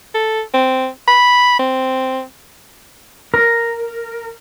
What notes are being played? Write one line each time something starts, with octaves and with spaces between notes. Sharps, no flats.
A4
C4
B5
C4
A#4